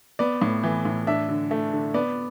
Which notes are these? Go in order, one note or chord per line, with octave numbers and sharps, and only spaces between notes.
B3 D5
A2
E3
A2
D4 E5
D3
A3
D3
B3 D5